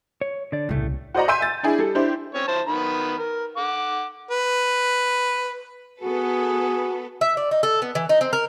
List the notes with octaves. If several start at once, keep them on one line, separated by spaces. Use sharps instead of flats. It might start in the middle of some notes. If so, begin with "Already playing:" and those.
C#5
D3 D5
D#1 C2 A2 C#3 A3
F#4 C5 D5 D#5 F#5 A#5
E5 G#5 C6 E6 G6 D#7
A6
D4 E4 G#4
G3 A4
D4 E4 G4 C5
C4 C#4 C#5
E4 C5 A5
D#3 B3 B5
A#4
F#5 D6
B4
B3 F#4 G#4 A4 B4
E5
D5
D#4
A4
B3
E3
D#4
C4
A#4